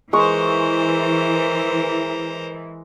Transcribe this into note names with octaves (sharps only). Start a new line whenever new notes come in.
E3 G#3 A#4 C5 C#6